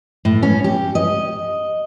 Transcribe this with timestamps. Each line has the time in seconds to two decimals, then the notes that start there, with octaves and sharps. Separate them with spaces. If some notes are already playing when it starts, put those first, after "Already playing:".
0.25 A2
0.42 C#4
0.64 G4
0.95 D#5